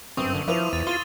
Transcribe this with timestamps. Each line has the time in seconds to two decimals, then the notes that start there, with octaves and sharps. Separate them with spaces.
0.17 G1 F#2 C4 C#6 D#6 E6
0.35 D3
0.48 F3 E4 B4 C5 D6 D#7 F7
0.73 E2 A6 D#7 F7
0.87 F4 C6 A6 D#7 G7